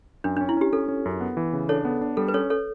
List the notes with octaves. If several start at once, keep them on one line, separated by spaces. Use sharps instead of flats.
F#2 D4
D4
C#4
E4
C#4 G4
C#4 A4
C#4
F#2
B3
E3
C#3
D4 A4 C#5
B3
D4
G3 A4
B4
C#4 A4 C#5
A4 C#5